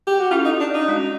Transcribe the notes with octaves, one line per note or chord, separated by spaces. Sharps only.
G4
F#4
C#4 E4 F4 A4
D#4
D4
D#4
G#3 C#4 F#4